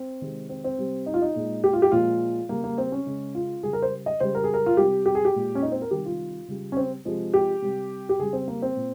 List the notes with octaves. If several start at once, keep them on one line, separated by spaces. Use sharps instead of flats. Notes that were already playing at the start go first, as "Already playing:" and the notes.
Already playing: C4
C3 D#3 G#3
C4
C4
C3 G3
D#4
F4
D#4
A#2 G#3
G4
F4
G4
A#2 F3 G#3 F4
C#3 G3 A#3
A#3
C4
C#4
C#3 G#3
F4
C#3 G3 G#4
A#4
C5
D#5
C#3 G3 C5
A#4
G#4
A#4
F4
C3 G3 G4
G4
G#4
G4
A#2 G#3
C#4
D#4
C4
A#4
C3 D#3 G3 G4
F4
C#3 G3
C#4
C4
C3 F3 G#3
G4
C3 G3
G4
C#3 G3 G#4
C4
A#3
C4
A#2